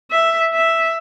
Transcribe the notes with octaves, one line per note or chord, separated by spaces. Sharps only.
E5
E5